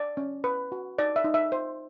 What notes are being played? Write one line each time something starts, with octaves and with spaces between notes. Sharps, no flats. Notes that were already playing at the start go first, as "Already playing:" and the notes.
Already playing: D5
C#4
B4
F#4
D#4 D5
E5
D#4
E5
C5